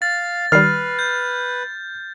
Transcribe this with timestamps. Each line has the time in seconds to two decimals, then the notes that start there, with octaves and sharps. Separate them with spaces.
0.02 F5 A6
0.52 D#3 G3 B4 F6 C7
0.99 G6